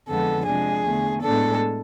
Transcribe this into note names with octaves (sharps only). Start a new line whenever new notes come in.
F2 D3 F3 G#3 B3 A4
C3 F3 G#3 D4 G#4
E2 D3 A3
A2 G#3 B3 D4 A4